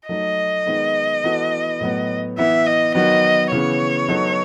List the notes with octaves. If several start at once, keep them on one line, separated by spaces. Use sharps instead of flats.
F#3 A3 D#4 D#5
D#3 G#3 B3 D#4
E3 B3 F#4 A4
A2 F#3 B3
E3 B3 E4 E5
D#5
D#3 F#3 B3 F#4 D#5
C#3 E3 B3 C#5
F#3 B3 D#4 A4